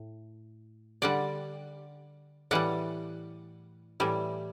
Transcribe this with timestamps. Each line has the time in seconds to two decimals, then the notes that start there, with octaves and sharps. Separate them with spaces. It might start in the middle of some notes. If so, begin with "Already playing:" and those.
Already playing: A2
1.02 D3 G3 D5 F#5
2.51 A2 E3 G3 D5 F#5
4.00 A2 E3 G3